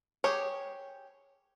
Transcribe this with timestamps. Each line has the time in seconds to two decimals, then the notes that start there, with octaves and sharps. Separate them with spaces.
0.24 G4 G#4 C#5